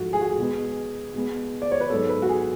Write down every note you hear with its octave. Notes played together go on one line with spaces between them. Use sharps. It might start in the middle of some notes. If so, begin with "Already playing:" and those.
Already playing: G#2 F3 A3 F#4
G#4
F#4
G#4
B2 G#3 B3
B2 G#3 B3
D5
C#5
B4
G#2 F#3 B3 A4
B4
F#4
G#4